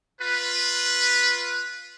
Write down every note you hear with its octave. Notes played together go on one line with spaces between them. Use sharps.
F4 B4